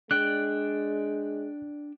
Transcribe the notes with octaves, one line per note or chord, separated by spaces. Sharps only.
G#3 D4 D5 G5 F#6